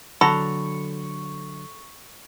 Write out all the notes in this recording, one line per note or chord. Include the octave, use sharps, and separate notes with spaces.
D3 F#3 A4 F#5 A#5 B5 C#6